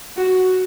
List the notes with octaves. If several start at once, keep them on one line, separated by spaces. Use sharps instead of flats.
F#4